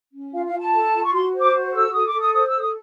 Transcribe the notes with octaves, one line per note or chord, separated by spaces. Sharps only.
C#4
F4 F5
F5
F4
A5
A4
F4
C#6
F#4 C6
C5
D6
F#4
A4 E6
A4 D#6
D6
A4
D#6
C5 D#6
E6
A4
D#6